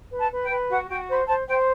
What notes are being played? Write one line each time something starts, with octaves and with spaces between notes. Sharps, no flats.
B4
A5
B4
G5
B4
F#4 F#5
F#4 G5
C5 B5
C5 A5
C5 G5